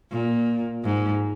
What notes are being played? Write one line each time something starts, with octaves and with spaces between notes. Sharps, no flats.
A#2
G#2